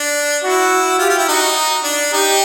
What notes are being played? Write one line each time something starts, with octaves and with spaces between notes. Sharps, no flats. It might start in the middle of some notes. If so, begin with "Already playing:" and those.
Already playing: D4
E4 F#4
F4 G4
F4
E4
D#4 F#4
D4
D#4 G4